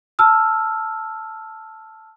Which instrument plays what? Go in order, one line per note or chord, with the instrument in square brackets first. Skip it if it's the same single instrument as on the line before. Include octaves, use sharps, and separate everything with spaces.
[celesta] A5 E6 F6